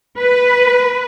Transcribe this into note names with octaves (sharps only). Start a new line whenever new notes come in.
B4